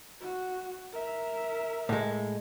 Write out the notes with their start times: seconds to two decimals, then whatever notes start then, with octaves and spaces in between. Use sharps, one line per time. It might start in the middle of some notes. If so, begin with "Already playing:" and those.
0.20 F#4
0.92 A#4 E5
1.89 A2 G#3